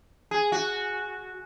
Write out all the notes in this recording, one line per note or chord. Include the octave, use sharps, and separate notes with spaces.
G#4
F#4